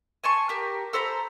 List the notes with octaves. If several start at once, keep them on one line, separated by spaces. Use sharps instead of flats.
G#5 A5 C6 C#6
G4 A#4
A4 C5 A#5 B5